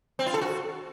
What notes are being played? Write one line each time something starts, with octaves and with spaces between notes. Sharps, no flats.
C4
F4
A4
F#4